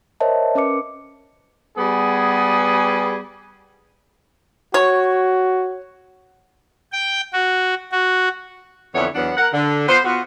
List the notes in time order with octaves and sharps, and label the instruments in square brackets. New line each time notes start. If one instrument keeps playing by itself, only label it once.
[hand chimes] A#4 C5 C#5 D#5 E5 A5
C#4 A#4 B4 D6 C#7
[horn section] G3 B3 G#4
[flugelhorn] F#4 [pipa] C#5
[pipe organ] G5
F#4
F#4
[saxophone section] F2 D3 E3 B3 C#5
E2 F#3 B3 D4 F#5
A#4 F#5
D3
B3 F4 C5
B3 F4 F#4